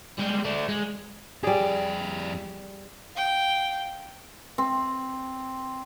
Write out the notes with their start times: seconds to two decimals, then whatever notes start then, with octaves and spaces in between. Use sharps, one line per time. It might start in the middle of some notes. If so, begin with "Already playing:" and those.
0.18 G3 G#3
0.44 A3 D4
0.69 G#3
1.43 F2 G3 G#4 D5
3.12 F5 G5
4.58 C4